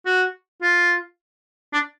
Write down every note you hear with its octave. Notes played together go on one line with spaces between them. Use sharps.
F#4
F4
D4